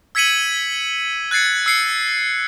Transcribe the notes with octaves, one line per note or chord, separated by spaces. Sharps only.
E6 G#6 B6 C#7 D#7 F#7
F#6 G#6 A6 C7 C#7
E6 C7 C#7